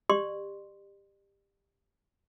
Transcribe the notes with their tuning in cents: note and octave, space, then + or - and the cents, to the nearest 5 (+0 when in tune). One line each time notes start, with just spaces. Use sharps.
G4 +15 D5 +40 C6 +0